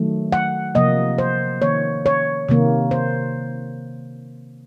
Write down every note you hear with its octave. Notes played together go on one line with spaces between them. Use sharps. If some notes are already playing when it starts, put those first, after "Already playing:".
Already playing: D#3 F#3 A3
F#5
C3 F3 A#3 D#5
C5
D#3 A#3 C#5
C#5
C3 D#3 A#3
C5